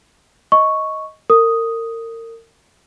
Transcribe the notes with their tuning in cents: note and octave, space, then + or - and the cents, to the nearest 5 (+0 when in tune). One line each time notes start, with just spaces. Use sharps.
D#5 +10 C#6 +0
A#4 -35 D#6 +0